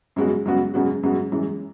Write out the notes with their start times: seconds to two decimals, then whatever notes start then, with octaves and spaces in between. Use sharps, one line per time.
0.16 F#2 C#3 G#3 B3 F#4
0.45 F#2 C#3 G#3 B3 F#4
0.74 F#2 C#3 G#3 B3 F#4
1.03 F#2 C#3 G#3 B3 F#4
1.32 F#2 E3 G#3